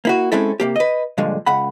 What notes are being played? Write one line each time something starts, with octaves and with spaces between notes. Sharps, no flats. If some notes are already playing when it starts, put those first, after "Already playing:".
A#3 E4 F#4
G#3 C4 C#4 E4 A4
C3 A#3 G4
B4 D#5
G2 A#2 D3 F3 G#3
C#2 F#5 B5